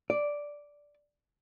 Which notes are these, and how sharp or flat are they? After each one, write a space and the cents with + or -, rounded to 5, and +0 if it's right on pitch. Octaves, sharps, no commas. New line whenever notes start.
D5 -5